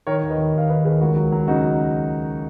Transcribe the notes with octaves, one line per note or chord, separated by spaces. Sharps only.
D#3 A#4 C#5
D#2
B4 D#5
D#2
D#2 F5
D#3 B4 D#5
D#2 G#4 B4
C#2 F#4 A#4
F#3
F#3
C#3 D#4 F#4